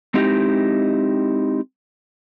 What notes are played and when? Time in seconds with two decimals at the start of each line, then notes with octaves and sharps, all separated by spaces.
0.14 G#3 C4 D#4 E4 G4 D#5